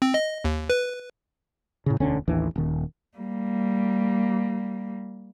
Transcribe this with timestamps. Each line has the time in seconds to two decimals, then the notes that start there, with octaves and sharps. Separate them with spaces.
0.02 C4
0.14 D#5
0.45 D#2
0.70 B4
1.86 A2 C#3
2.00 E1 D2 D3 C#4
2.28 A1 D#2 E3 D4
2.56 D#1 D#3
3.18 G3 A#3